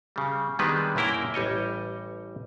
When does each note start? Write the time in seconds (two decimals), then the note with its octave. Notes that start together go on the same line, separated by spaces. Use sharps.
0.16 C#3 G3
0.59 D#3 G3 G#3 B3 D4 B4
0.96 F#2 A#3 E4 A#4 G5
1.34 A1 G3 C#5 D#5